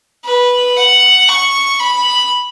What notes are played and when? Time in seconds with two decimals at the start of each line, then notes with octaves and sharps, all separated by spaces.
0.25 B4
0.77 F#5
1.29 C#6
1.79 B5